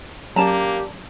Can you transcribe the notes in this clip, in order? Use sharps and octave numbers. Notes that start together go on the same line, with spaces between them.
F#3 A#3 C#4 G4 D5 A5 A#5